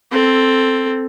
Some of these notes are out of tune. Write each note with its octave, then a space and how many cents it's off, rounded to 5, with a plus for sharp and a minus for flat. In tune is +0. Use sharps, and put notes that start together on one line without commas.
C4 +0 A4 +0